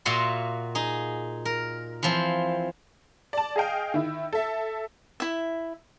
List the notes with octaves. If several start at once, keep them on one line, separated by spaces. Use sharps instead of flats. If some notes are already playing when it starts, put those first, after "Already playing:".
A#2 A#3 F#4 E5 F#5 C6
D#4 G#4
A#4
E3 F3 C4
D5 A5
G#4 D#5 F5 G5
D#3 E4
A4 E5
E4 E5